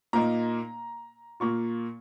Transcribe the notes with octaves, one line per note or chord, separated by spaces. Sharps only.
A#2 A#3 D#4 A#5
A#2 A#3 F4 C#6